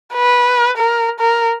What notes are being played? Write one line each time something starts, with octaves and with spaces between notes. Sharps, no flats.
B4
A#4
A#4